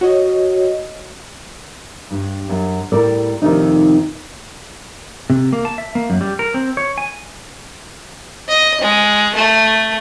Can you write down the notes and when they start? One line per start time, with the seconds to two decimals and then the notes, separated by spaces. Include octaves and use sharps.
0.01 F#4 C#5 D#5
2.11 G2
2.49 F#2
2.92 A2 G3 A4 A#4 D5
3.42 F2 C3 D#3 A3 D4 D#4
5.30 C3
5.53 A#3
5.65 A5
5.78 E5
5.95 A#3
6.10 F#2
6.21 G3
6.39 A#4
6.54 C4
6.77 C#5
6.98 G#5
8.48 D#5
8.81 G#3
9.35 A3